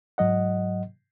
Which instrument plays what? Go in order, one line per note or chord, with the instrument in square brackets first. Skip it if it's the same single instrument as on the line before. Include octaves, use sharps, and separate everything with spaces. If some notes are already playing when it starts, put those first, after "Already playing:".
[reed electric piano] G#2 F#3 D#5 F#5